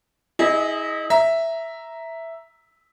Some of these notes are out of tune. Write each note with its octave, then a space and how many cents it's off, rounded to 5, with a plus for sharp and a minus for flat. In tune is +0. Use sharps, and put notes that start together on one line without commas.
E4 -30 G#4 +0 D#5 -5
E5 +0 A#5 +0